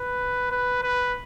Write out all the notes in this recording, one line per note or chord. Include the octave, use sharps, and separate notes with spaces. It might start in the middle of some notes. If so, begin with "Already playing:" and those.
Already playing: B4
B4
B4